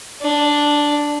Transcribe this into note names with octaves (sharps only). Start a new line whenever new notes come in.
D4